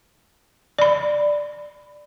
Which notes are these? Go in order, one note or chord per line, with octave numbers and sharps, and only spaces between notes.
D5 B5